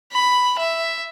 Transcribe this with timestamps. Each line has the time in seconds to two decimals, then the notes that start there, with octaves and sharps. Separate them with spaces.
0.13 B5
0.59 E5